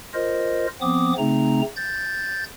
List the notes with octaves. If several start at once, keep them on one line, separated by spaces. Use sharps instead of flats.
F4 A#4 C5 D#5
F3 B3 C4 D6 D#6
C#3 A3 C4 D#4 A#5
G6 A6